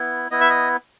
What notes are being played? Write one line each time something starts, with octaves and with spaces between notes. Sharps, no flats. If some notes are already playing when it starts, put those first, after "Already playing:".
Already playing: B3 E4
B3 E4 D#5
E5
D#5